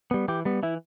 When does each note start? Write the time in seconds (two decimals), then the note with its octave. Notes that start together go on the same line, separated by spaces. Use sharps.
0.11 G3 B3
0.28 E3 G4
0.45 G3 B3
0.63 E3 E4